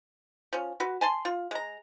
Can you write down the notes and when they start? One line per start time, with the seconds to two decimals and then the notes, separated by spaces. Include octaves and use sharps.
0.53 F3 C#4
0.80 F#4 B4
1.01 G#5 A5 C6
1.25 F4
1.51 G#3 A#5